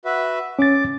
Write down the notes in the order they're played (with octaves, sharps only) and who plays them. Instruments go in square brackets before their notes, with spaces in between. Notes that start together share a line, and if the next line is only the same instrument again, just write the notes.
[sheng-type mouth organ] F#4 B4 E5
[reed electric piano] C#4 A6 [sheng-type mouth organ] D6